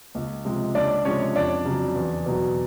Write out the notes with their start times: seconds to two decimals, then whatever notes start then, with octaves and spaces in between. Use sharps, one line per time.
0.15 C#2
0.45 C3 F3 G#3
0.75 C#2 D4 D5
1.05 C3 F3 G#3 C#4 C#5
1.36 F2 D4 D5
1.65 C#3 F#3
1.96 E2
2.26 B2 F#3